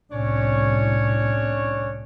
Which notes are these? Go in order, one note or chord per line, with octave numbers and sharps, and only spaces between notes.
C2 A2 C#4 D4 C#5